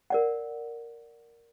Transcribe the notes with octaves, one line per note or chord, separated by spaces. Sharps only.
A#4 D5 F#5